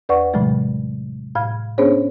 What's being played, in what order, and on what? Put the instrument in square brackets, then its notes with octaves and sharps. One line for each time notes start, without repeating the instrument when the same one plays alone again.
[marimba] E2 B4 D5 F#5 C#6
A2 C3 E3 F#3 G#3 A3
A2 F5 F6 G#6
B3 C#4 D4 G#4 C5 C#5